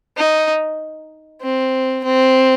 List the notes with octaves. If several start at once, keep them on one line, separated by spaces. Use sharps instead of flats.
D#4
C4
C4